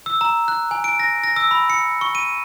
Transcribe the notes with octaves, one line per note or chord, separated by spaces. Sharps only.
E6
A#5
F#6
G#5
D7
A#6
A#6
E6
B5
C#7
C#6
D#7